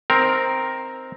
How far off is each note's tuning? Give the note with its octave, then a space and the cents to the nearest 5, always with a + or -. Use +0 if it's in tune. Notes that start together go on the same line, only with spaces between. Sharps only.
C4 +0 D#4 +0 A#4 +0